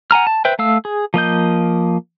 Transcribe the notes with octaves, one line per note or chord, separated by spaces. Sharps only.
F#5 G#5 A#5 F6
A5
B4 C5 E5 G5
A3 F5 E6
G#4
F3 A#3 D#5 G6